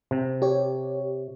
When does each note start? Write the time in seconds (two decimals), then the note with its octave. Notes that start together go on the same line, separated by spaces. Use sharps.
0.11 C3
0.42 G4 C#5